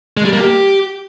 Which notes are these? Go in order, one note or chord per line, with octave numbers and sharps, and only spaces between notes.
G#3
G3
A#3
G4